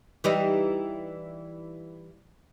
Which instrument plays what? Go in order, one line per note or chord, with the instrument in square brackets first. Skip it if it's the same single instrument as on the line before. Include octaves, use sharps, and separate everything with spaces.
[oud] E3 G3 D#4